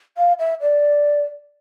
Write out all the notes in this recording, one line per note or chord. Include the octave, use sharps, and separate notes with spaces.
F5
E5
D5